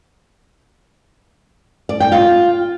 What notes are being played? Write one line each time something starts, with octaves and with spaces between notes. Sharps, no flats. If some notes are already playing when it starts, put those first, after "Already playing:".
D5
G5
F4